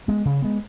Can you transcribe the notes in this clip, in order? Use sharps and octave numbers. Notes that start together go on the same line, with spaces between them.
G#3 B3
C#3
G#3 B3